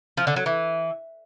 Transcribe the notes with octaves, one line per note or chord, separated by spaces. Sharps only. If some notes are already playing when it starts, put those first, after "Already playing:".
F3
D3
F#3
E3